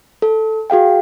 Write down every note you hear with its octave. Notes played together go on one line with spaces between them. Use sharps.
A4
F#4 G#4 F5 G5